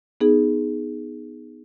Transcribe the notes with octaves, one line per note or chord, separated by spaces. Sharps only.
B3 D#4 G#4